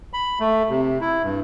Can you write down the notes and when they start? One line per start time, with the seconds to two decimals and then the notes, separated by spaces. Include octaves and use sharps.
0.13 B5
0.40 A3
0.70 C3
1.01 E4
1.23 G2